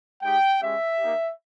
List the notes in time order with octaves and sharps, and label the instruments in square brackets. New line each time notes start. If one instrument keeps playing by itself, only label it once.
[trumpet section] G#3 D#4 G4 G5
G#3 C#4 G4 E5
A#3 D#4 G4